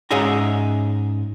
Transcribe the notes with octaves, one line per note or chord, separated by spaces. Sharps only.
G#2 C#4 G#4 D#5 E5 A#5